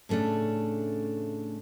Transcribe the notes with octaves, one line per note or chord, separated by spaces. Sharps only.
A2 C#3 A3 C#4 D4